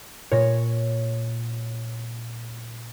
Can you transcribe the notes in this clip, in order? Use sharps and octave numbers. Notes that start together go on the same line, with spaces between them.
A#2 C#5 A#6